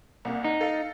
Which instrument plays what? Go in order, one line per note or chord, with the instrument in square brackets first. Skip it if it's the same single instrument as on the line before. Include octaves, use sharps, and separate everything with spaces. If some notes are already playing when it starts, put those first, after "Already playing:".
[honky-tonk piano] C2 A#3
[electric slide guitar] D#4
[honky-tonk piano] A4 F5